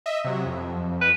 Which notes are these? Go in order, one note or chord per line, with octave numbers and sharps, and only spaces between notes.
D#5 E5
C3 F#3
F2
B4